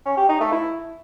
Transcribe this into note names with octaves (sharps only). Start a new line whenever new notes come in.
C#4
G4
D#4
A3
E4